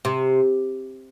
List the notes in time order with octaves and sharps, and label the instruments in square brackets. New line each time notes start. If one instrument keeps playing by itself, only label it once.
[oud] C3